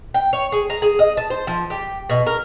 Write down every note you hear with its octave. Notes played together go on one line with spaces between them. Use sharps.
G5
C#5
G#4
A#5
G#4
D#5
A5
C5
F3
G4
B2
A#4